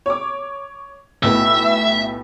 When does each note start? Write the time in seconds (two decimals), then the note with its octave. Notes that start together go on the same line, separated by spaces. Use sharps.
0.06 C#5 D6
1.23 B1 A2 B3 E5